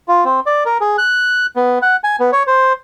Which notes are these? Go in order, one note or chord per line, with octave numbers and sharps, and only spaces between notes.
F4
C4
D5
A#4
G#4
F#6
B3
F#5
G#5
B3
C#5
C5